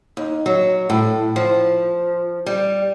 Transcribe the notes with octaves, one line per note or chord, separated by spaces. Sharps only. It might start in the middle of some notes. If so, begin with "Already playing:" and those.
D#2
F#3
A2
F3
G3